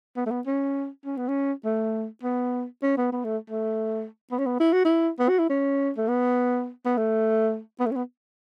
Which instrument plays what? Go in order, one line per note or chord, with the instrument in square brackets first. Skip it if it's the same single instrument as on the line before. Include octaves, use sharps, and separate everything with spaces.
[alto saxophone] B3
A3
B3
C#4
C#4
B3
C#4
A3
B3
C#4
B3
B3
A3
A3
B3
C#4
B3
E4
F#4
E4
B3
F#4
E4
C#4
A3
B3
B3
A3
B3
A3
C#4
B3